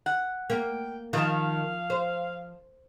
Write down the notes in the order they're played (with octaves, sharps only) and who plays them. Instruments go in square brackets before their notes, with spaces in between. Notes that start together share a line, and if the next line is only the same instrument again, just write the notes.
[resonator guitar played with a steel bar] F#5
[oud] A#3 [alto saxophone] G5
[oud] D#3 [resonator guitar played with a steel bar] F3 A5 [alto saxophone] F5
[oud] C5